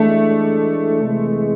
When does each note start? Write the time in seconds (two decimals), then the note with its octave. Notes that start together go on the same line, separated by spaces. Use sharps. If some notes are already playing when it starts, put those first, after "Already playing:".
Already playing: E3 G#3 A3 D4 A4
0.99 C3 E3 G#3